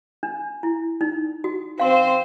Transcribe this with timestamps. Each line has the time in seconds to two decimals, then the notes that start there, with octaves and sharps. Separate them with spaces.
0.23 D4
0.63 E4
1.01 D#4
1.44 F#4
1.80 C4 C5 F5 C6